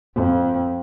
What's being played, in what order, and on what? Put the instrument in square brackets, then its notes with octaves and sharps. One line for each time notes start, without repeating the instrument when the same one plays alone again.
[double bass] F2